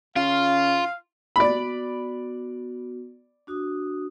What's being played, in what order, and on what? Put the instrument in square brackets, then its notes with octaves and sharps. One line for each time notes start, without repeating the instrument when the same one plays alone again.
[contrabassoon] C#3 [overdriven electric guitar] F4 [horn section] F5
[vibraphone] B3 F#4 [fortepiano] D5 B5
[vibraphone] D4 F#4 D#6